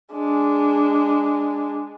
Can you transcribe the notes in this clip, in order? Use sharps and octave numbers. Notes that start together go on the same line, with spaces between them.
G#3 D4